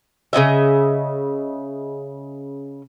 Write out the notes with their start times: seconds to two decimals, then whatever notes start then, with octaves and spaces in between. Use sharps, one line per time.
0.33 C#3 C4 D#5 E5